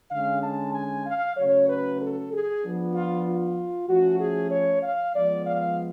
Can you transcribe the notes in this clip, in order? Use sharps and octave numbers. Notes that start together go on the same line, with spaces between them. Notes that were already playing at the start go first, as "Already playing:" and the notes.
D3 G#3 C#4 F5
A5
G#5
F5
C#3 F#3 A3 C#5
B4
A4
G#4
F3 B3 D4
F4
F4
F3 A3 C#4 F#4
G#4
C#5
F5
F3 G#3 B3 D5
F5